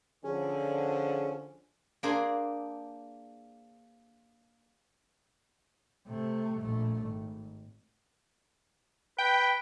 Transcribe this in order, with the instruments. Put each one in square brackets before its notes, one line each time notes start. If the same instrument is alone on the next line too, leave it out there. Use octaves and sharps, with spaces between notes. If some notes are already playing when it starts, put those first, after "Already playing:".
[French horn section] D3 F3 [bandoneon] C#4 [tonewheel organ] G#4
[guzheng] A#3 D4 G#4 C5
[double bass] C3 A3
A#1 A3
G#1
[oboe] B4 [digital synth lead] G5